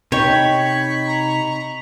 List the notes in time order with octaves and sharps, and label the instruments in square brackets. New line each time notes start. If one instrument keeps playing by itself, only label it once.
[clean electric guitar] C3 D#4 [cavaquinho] C#5 G5 [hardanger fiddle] B5 C#6 [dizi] G#6
[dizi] A#5